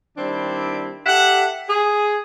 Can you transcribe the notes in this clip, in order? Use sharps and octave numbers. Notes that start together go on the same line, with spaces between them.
D#3 G3 C4 D4 E4
G4 A4 E5 F#5
G#4